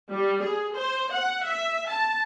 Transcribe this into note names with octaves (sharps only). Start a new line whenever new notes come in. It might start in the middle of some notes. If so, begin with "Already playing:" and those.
G3
G#4
C5
F#5
E5
A5